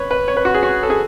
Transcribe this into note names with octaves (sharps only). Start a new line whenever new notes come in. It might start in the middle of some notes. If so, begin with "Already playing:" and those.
Already playing: B4 C#5
B4
C#5
B4
F#4
G#4
F#4
A4
G#4